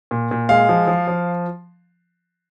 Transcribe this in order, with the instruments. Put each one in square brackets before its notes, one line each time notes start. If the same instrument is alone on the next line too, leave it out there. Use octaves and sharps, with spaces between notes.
[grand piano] A#2
A#2
G#3 F5
F3
F3
F3